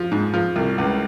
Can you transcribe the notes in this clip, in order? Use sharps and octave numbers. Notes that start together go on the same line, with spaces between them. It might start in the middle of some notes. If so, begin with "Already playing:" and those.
Already playing: F3
G#2
F3
C2
C#2